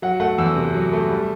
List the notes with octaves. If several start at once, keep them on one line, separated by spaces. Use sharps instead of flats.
F#3 F#5
A3 F#5
E2 E6
C3
F#3
A3
G3